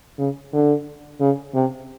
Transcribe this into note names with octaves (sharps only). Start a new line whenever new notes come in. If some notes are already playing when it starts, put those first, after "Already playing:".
C#3
D3
C#3
C3